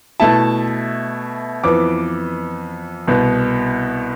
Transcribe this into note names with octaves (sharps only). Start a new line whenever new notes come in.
B2 A3 E4 A5
F2 E3 B3 D6
C2 B2 B3